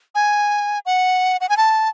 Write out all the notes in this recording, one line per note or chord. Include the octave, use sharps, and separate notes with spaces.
G#5
F#5
F#5
G#5
A5